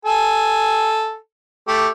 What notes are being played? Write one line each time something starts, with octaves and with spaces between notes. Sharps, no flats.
A4 G#5
A3 G4